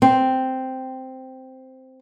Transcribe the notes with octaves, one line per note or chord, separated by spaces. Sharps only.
C4